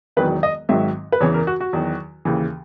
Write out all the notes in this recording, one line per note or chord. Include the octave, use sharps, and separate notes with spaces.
E1 E2 D#3 F#3 B4
D#5
G#1 G#2 D#3 F#3 E5
B4
E2 C#3 E3 C#5
A#4
F#4
F#4
E2 D#3 F#3
D#2 C#3 E3